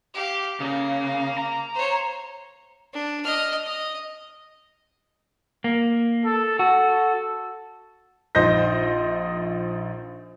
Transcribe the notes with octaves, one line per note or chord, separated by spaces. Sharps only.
G4 F5
C#3 A#3
A#5
C5 C#5
D4
D#5 F6
D#5
A#3
A4
F#4 A4
A#1 D#4 C5 D#5 G6 A#6